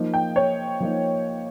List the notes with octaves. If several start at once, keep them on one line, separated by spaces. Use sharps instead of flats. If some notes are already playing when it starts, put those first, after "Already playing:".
Already playing: F3 A#3 D#4
G5
C#5
F3 A#3 D#4